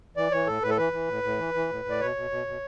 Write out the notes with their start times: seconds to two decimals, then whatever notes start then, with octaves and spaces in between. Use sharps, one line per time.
0.17 E3 D5
0.32 E3 C#5
0.47 A2 A4
0.62 A2 B4
0.70 A4
0.77 E3 B4
0.93 E3
1.08 A2
1.23 A2
1.39 E3
1.54 E3
1.70 A2
1.85 A2 D5
2.00 B2 C#5
2.16 B2
2.31 B2
2.47 B2